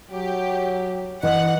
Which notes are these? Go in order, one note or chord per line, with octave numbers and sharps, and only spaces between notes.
F#3 G4
E3 D#5 F#5